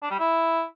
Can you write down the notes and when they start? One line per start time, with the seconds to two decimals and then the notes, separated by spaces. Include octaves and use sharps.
0.03 D4
0.11 G3
0.20 E4